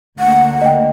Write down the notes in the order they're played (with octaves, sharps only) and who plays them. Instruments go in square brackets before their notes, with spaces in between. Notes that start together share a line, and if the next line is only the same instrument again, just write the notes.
[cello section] D2 D3 A#3 [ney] F#5
[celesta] D#5 G5